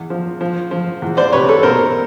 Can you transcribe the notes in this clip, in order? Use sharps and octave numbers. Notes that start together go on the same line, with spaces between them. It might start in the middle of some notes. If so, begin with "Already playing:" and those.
Already playing: E2
F3
F3
F3
E2
C5 D5
C3 B4 C#5
A4 B4
B2 A#4 C5